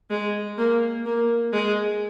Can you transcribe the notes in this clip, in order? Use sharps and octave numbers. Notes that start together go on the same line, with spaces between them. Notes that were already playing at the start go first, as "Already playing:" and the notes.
G#3
A#3
A#3
G#3